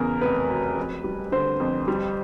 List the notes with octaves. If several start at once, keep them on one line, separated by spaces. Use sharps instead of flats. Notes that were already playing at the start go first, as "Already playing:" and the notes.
Already playing: E2 C#3 A#4
F1 B4
F#3
F2
G3
D3 C5
F2
G3